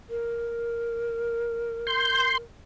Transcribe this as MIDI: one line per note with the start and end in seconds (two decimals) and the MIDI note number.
0.10 2.41 70
1.87 2.38 84
1.87 2.38 91